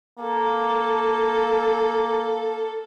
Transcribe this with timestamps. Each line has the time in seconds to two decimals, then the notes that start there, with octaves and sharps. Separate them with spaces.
0.19 A#3 A4